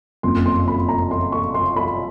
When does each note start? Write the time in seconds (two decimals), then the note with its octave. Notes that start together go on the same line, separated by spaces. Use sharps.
0.23 F#1 F2 C#3 F3 C6
0.46 C6
0.68 B5
0.89 A#5
1.11 C6
1.32 C#6
1.54 C6
1.76 B5